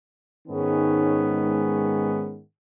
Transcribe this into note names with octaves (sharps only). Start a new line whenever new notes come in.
G#2 D#3 G#3 B3 C#4